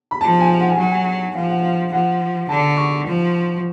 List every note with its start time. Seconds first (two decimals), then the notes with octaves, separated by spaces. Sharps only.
0.11 B5
0.21 F3 A5
0.40 G#5
0.59 F#5
0.70 G#5
0.78 F#3 F#5
0.91 G#5
1.01 F#5
1.35 F3 F5
1.49 F#5
1.62 F5
1.92 F3 F#5
2.49 D3 A5
2.77 C#6
3.06 F3